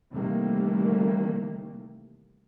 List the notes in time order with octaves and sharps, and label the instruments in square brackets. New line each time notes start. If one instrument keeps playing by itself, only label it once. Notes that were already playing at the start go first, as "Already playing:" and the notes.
[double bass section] C3 D#3 E3 G3 A3 A#3